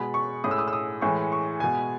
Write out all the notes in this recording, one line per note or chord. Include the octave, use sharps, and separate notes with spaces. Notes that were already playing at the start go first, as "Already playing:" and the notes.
Already playing: B2 G#3 B5
C#6
A2 G#3 D#6
E6
D#6
E6
D#6
A2 E3 G#3 C#6
C#6
B2 G#3 G#5